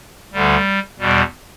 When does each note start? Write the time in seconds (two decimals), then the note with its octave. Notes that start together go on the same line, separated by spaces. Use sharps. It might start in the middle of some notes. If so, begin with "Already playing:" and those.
0.33 D2 D3 G3
0.99 E2 B2 G3